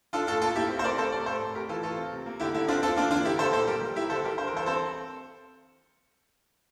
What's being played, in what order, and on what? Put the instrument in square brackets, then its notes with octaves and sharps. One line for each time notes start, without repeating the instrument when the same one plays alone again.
[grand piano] D4 F4 A4
A2 F4 A4
A#3 F4 A4
A#3 E4 G4
C4
C5
C3 A#4 D5
A3 A4 C5
C3 A#4 D5
A2 A4 C5
A2
A2 G4 A#4
E3 F4 A4
A3 F4 A4
C4
C3
A#3
D3 E4 G4
D3 E4
C4 D4 F4
C4 F4 A4
A#3 D4 F4
E3 D4 F4
D3 E4 G4
D3 A4 C5
A#2 A4 C5
G3 G4 A#4
G3
G3 E4 G4
D3 A4 C5
G3 G4 A#4
D4 C5
A#4
E3 A4 C5
C4 A4 C5